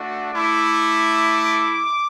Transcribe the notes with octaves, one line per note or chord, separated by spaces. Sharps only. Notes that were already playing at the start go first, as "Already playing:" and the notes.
Already playing: A3 D4 F#4
A3 E4 D6